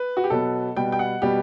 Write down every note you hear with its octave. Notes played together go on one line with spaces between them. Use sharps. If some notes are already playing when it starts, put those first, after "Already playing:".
Already playing: B4
F#4
G4
B2 F#3 B3 A4
B2 G3 B3 G5
G5
F#5
B2 G3 B3 G4